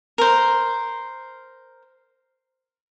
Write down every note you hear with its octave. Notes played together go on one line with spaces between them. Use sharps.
A#4 C5